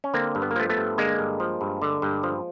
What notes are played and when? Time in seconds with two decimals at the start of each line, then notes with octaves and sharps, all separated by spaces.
0.04 C#4
0.14 D3 A#3 C4
0.35 G2
0.42 B3
0.51 A#3
0.56 F3 A3 B3
0.70 A3 B3
0.77 G2
0.98 D3 G#3 A#3
1.19 G2
1.40 F3
1.61 G2
1.82 D3
2.02 G2
2.23 F3